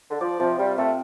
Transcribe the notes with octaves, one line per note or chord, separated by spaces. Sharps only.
D3
F3 D5
C3 F3
G3 F4
C3 A3